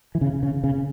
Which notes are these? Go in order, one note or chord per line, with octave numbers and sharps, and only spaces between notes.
E3
C#3
C#3
C#3